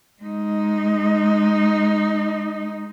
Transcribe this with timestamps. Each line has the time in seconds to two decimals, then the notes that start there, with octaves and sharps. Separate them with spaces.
0.22 G#3 D#4